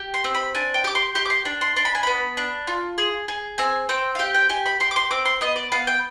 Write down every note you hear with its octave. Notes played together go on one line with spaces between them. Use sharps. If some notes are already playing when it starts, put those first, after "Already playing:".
Already playing: G4
C6
C4
B5
D4 G#5
G5
G4 D6
C6
G4 C6
D6
C6
D4
C6
D4 C6
B5
G#5
B3 B5
D4
F4
G#4
G#4
C4 G#5
C4 G5
F5
G4 G5
G5
G4 G#5
B5
G4 C6
D6
C6
C4 D6
C6
B3 D#5
D5
B3 F5
G5